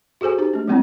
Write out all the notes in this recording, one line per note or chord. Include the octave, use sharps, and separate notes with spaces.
F#4 G#4 A4 C5 G#5
D#4 G4 C5
A3 D4
F#3 G#3 B3 C4 D4 E4